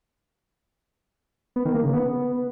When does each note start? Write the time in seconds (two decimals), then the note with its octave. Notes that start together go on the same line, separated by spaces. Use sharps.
1.56 B3
1.65 D#3
1.75 A#3
1.84 C#3
1.93 B3